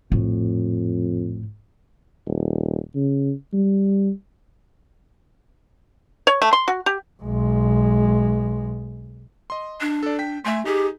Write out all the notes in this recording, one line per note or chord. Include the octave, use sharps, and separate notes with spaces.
A#1 F2 A2
D#1
C#3
G3
C#5
A3
C6
F#4
G4
B1 G#3
D#5 C6
D4
A4 D5
G5 B6
A3 E5 G#5 C6
D#4 G4 G#4